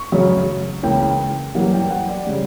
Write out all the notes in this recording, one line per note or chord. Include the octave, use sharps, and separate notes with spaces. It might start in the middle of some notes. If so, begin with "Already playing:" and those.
Already playing: C#6
F#2 C#3 F#3 C#4
C#2 C#3 E3 A#3 C#4 G5
F#2 E3 G3 A#3 F#5
G5
F#5
D5
C#3 G3